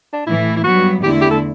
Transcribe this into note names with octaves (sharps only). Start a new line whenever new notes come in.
D4
A2 E3 A3 E4
E4
G2 F#3 B3 F#4
E2 D3 A3 E4 G4
G4
A4